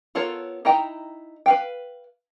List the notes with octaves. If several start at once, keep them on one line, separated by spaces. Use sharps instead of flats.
B3 F4 A4 A#4 C#5
D#4 E4 D#5 G5 A#5
B4 F5 G5